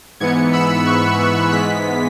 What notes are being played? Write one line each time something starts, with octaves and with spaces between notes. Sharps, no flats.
G#2 E3 B3 G#6 C#7
B5 E6
C#6 F#6
C#6 F#6
G#2 E3 G#3 B3 F#6 B6